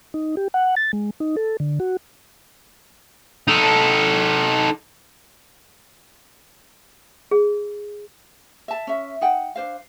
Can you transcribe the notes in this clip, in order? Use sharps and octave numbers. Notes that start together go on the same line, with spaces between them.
D#4
G4
F#5
A6
G#3
D#4
A4
D3
F#4
D#4 A4
G#4
E5 A5
C#4 E5
D#4 F#5 G5
D4 C5 F5